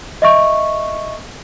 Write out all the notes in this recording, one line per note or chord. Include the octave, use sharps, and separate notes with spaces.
D#5 E5 C#6